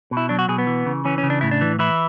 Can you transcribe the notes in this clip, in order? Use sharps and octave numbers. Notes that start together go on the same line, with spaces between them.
B2
E4
F#3 D4
F#4
B2 G#4
B3
E3
C#3
E3 C#4
C#4
C#3
D4
A2 E4
D4
E3
E3 E4